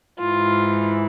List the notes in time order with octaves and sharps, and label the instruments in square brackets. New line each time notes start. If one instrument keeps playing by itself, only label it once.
[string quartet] G#2 E3 F4